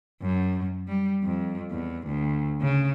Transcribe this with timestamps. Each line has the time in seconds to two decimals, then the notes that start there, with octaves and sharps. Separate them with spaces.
0.22 F#2
0.88 G3
1.24 F2
1.71 E2
2.06 D2
2.61 C#3